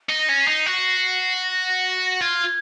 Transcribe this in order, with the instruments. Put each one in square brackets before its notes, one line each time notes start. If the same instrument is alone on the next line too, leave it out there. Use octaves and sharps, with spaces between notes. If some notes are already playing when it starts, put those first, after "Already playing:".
[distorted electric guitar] D#4
[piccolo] A#6
[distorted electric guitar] C#4
[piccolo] C7
[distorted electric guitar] D#4
F#4
[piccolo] A#6
[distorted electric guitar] F4 [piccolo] G#6